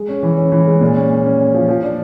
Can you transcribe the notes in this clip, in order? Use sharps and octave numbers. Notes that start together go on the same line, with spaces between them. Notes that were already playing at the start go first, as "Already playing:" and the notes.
Already playing: G#3
C#4
E3
C#4
E3
G#3
A#2
C#4
C#4
C#4
C#4
F3
F3
D4